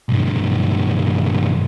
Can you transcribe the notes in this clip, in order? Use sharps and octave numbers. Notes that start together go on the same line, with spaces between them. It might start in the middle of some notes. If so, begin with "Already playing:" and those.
B1 G2